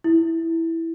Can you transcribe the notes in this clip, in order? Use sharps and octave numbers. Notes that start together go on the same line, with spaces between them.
E4